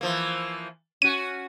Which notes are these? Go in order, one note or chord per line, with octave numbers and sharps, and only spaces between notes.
E3 F3 A#3
C#4 F#4 D#7